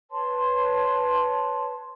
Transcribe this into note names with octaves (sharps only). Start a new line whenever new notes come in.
B4 C#5 A5 C6